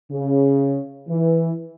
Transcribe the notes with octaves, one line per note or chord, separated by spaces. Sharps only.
C#3
E3